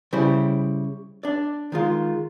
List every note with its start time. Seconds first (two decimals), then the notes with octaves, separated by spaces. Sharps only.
0.13 C#3 G3 E4 G4 C5
1.23 D4 D5
1.72 D#3 G#3 F4